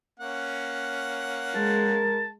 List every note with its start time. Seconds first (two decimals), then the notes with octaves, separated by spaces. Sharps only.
0.20 A#3 C#4 F#5
1.55 G#3 A#4 A5